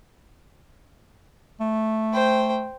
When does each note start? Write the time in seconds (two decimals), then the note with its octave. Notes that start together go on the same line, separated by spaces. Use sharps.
1.61 A3
2.13 C5 G5